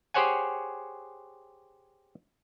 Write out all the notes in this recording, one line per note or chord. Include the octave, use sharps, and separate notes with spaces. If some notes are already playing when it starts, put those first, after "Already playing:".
G4 G#4 C5 C#5 F#5 G#5